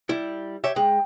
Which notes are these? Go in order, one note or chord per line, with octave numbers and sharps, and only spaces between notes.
G3 E4
G4 C#5 E5
G#3 G5